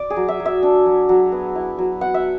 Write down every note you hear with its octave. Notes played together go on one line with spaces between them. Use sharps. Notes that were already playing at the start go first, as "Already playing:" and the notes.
Already playing: D5
G#4
F#3
E5
F#3
E5
D4
F#3
F#3
B3
E4
F#3
B3 F#5
E5